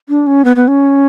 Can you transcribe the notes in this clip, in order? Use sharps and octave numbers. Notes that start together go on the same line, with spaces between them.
D4
C#4
B3
B3
C#4